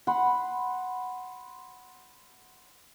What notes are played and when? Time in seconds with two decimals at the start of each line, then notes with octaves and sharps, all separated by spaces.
0.07 F#5 B5 C6